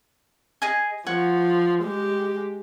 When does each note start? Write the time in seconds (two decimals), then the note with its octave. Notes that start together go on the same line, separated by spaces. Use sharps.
0.62 G#4 D#5 G#5
1.06 F3 C#5 F#5 C#6
1.83 G#3 G4